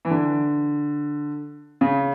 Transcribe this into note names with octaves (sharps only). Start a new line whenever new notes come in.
E3
D3
C#3